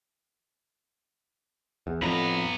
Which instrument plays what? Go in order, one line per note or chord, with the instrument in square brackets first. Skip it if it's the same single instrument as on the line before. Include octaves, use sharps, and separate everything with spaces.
[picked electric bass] E2
[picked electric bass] F2 A2 [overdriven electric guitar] B3 A#5